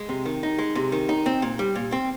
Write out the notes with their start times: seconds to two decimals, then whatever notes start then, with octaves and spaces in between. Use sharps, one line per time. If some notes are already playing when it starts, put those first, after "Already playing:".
Already playing: G#3
0.09 C3
0.25 D#3
0.43 D#4
0.59 G#3
0.75 C3
0.92 D#3
1.09 D#4
1.26 C4
1.42 A#2
1.59 G3
1.75 A#2
1.92 C4